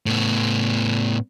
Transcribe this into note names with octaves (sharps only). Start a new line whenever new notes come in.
A2 B3